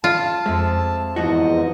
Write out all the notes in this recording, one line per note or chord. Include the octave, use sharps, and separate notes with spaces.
F4 A5
F2 G#3 E5
E2 G#2 E3 F3 F#4 D#5